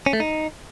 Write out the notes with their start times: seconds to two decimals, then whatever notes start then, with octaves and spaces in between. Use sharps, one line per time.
0.06 C#4
0.13 A3
0.20 D#4